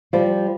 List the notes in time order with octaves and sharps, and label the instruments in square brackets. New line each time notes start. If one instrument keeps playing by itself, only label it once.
[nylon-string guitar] F3 G3